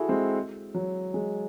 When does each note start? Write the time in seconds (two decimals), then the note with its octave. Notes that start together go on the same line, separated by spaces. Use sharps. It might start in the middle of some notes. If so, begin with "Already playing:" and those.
Already playing: E4 F#4 G#4 A4
0.09 G#3 C4
0.74 F#3
1.14 G#3